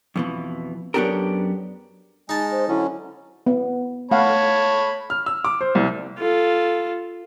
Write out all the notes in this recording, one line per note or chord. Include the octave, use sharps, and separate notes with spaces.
F2 B2 E3
F#2 B3 D4 G4 A4 A#4
G#3 D#4 G#5 A5
C5
D3 F#3 C#4 E4
B3
A3 C#5 F5 F#5 A5 B5
F6
E6
D6
C5
C2
F4 A4